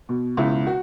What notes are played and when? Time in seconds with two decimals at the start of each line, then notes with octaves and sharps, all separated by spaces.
0.09 B2
0.37 C#2 E4
0.67 F#4